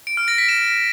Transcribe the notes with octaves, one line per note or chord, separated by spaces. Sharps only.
D7
F6
A#6
B6
E7